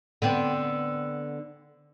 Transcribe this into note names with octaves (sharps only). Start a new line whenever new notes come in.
D3 B3 C4